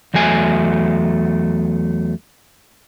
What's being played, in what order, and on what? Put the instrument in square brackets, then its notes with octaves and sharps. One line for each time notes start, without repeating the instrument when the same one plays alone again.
[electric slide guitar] E2 F#3 A3 G#5